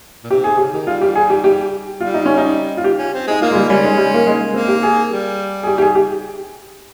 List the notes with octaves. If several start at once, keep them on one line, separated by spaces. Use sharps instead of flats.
A#2
C3 G4
G#4
C#3 G4
D#3
G3 F4
G4
G#4
G4
G4
G3 F4
D#4
C#4
D#4
F4
G4
C#4
C4
G#3 D#4
A#3 F4
G#3
G3
G3 C#4
G#3
G3
A#3
G#3
A#3 C4
G4
G#4
G3
G#4
G4
G4
G#4
G4